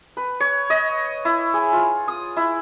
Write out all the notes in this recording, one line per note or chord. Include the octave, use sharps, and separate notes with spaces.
B4
C#5
D#5
E4
G#4
F4
D#6
E4